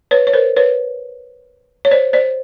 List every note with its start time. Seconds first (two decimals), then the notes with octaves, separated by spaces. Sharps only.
0.11 B4 C#5
0.27 C#5
0.33 A#4 C5
0.57 B4 C#5
1.85 C#5
1.91 C5 D5
2.13 C5 D5